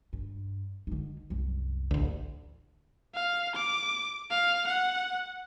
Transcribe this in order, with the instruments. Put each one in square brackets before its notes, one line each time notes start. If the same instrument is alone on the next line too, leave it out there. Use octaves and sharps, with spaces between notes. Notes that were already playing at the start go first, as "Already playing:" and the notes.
[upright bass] G2
D3 D#4
C2 F#2
[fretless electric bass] A1 D2
[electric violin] F5
D6
F5
F#5